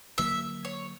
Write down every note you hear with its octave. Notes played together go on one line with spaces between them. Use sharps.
D3 F#3 A#3 E5
C#5